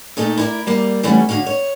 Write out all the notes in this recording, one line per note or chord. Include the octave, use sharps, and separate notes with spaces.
A#2 A3 D#4 A4
E4 A#4 D5
G3 A#3 D5
E3 G3 A3 B3 C#4
D3 C#4 F#4 F5
C#5